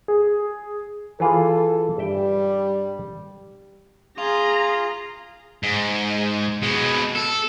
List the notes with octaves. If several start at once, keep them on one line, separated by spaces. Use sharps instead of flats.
G#4
E3 F4 G#4 A4
G2 G3 E5 G5
F4 G#4 A#5
G#2
B2 G#3
A4